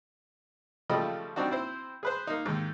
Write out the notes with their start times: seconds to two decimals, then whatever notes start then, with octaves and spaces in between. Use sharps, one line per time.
0.90 C#3 F3 G3 A3 D#5 B5
1.36 G3 C4 D4 D#4 F#4
1.51 C4 E4 C5
2.03 G#4 B4 C5
2.27 A#3 D#4
2.45 D#2 G#2